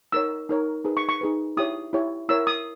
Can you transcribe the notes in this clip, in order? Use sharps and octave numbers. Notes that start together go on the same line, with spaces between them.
D#4 A#4 C#5 E6
D#4 A#4 C#5
D#4 G#4 B4
C#6
C#6
D#4 G#4 B4
E4 G4 C#5 D#6
E4 G4 C#5
E4 A#4 C#5 E6
D#6